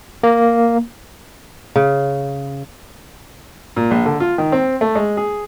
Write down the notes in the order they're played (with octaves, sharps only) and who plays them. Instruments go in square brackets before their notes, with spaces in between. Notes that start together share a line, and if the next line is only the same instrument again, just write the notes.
[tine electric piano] A#3
[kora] C#3
[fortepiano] A#2
A#1
D3
F4
D#3
C4
A3
G#3
G#4